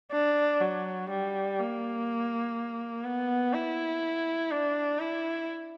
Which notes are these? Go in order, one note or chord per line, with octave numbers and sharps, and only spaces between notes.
D4
F#3
G3
A#3
B3
E4
D4
E4